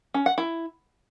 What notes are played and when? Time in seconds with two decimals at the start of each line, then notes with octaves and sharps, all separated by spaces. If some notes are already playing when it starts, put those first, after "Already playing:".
0.14 C#4
0.26 F#5
0.38 E4